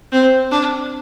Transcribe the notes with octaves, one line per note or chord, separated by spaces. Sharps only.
C4
D4